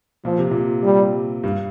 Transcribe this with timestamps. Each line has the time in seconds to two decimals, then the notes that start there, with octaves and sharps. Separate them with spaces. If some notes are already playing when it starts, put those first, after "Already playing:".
0.25 A#2 F3
0.38 C3
0.51 A#2
0.83 G3
1.44 G2